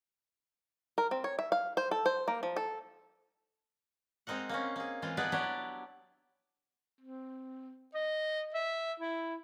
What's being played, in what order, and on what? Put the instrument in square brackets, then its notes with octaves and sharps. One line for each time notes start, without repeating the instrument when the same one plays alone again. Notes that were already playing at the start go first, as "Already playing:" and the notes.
[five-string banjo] A#4
C4
C#5
E5
F5
C5
A4
C5
A#3
F3
A4
[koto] G#3 C4 D#4 A#4 F#5
A#3 C4 C#4
A#3 G#4
E3 G#3 C4 F4
B3 D4 D#4 G#4 B4 D5
F#3 D4 E4 G4 D5
[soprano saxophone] C4
D#5
E5
E4